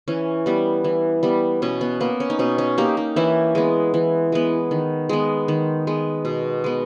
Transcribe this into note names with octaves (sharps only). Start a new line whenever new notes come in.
E3 C#4
G3 B3
E3
G3 B3
B2 C#4
B3
A#3 B3
C#4
D#4
B2 C#4
C#4
A#3 D#4 G4
D#4 G4
E3 C#4 E4
G#3 B3
E3
G#3 B3
D#3
G#3 B3
D#3
G#3 B3
B2
G#3 B3